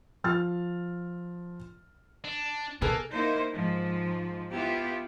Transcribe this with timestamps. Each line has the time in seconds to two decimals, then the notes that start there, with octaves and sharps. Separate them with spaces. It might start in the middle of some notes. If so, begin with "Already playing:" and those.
0.24 F3 F6 A6
2.24 D4
2.82 B2 A#3 G#4 A4 B4
3.11 A#3 D#4 E4 C5
3.54 G#2 F3
4.52 B3 E4 F4 G4